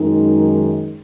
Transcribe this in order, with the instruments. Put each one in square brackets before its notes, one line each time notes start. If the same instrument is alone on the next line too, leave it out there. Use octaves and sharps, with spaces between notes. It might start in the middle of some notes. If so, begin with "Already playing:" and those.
Already playing: [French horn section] F#2 D#3 G#3 D#4